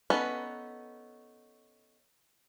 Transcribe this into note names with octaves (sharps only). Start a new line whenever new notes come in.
B3 C#4 D#4 A4 B4